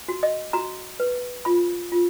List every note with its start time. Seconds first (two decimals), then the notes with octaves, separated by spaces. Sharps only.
0.08 F#4
0.23 D#5
0.53 F#4 A#5
1.00 B4
1.45 F4 B5
1.92 F4